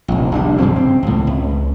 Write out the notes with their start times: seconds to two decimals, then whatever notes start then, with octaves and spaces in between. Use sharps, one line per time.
0.08 F1 A#1
0.32 A#1 G3 D4
0.58 G2 C#3 F3 C4
0.76 C4
1.03 C#2 A2
1.27 C#2